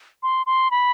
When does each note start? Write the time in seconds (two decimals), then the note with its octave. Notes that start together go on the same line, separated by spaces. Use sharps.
0.23 C6
0.46 C6
0.71 B5